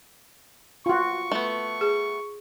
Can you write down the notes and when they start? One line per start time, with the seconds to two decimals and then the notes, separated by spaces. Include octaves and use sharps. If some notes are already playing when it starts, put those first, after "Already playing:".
0.86 F4 F#4 C#6
1.32 A3 B3
1.81 G#4